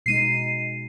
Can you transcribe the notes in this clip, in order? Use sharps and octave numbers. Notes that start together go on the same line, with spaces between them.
B2 G#3 D#4 C7 D#7